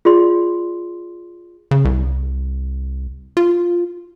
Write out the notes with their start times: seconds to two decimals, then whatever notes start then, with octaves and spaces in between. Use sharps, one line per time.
0.05 F4 G#4 D5 C6
1.71 C#3
1.85 C2
3.37 F4